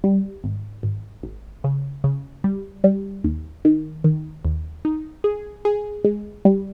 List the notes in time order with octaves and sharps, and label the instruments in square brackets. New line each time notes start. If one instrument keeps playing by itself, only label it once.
[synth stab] G3
G#1
G#1
G#1
C#3
C#3
G3
G3
D#2
D#3
D#3
D#2
D#4
G#4
G#4
G#3
G3